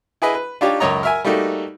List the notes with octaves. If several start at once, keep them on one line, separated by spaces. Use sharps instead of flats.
E4 G#4 B4 D#5
B4
D4 D#4 F4 G4 C#5
C#2 F#2 C#5 D#5 A#5
A#4 E5 G#5
G3 A3 A#3 D#4 F#4